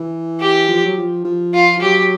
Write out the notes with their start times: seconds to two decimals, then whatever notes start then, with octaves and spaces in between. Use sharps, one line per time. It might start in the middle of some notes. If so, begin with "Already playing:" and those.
Already playing: E3
0.40 G4
0.69 F3
0.85 F#3
0.97 F3
1.25 F3
1.54 F4
1.77 F3
1.82 F#3 G4